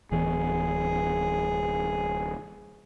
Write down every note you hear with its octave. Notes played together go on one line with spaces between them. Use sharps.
D1 E3 B3 G#4